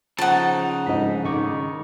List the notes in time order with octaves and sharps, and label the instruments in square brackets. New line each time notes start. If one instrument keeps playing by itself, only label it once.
[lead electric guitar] C#3 D#4 [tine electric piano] F3 [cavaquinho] F#5 A5
[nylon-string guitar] G#2 D#5 [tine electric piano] F3 D4 B6
[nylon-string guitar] D#3 [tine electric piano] D#5 C#6 D6